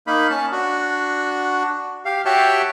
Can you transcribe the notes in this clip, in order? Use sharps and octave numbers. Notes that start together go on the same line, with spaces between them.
A#3 D#4 B5
C#4 A5
D4 F#4
G4 F5
F#4 G4 C#5 E5 G5 A5